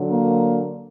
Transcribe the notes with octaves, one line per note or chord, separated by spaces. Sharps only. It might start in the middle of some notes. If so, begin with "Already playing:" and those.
Already playing: D3 F#3
A#3